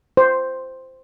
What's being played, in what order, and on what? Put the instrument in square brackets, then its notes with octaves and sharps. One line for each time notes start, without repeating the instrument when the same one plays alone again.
[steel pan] C5